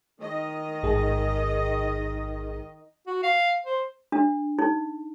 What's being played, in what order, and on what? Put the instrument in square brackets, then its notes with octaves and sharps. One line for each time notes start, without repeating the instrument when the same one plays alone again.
[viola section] D#3 D#5
[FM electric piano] A1 G#2 G#4
[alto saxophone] F#4
F5
C5
[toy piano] D4
D#4